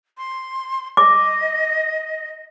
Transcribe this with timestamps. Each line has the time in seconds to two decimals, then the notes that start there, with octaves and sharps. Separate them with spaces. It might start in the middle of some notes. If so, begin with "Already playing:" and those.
0.17 C6
0.97 D#5 D6